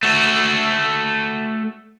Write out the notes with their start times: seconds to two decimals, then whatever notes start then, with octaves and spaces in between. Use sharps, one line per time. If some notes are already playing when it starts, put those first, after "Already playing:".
0.03 A3 F#4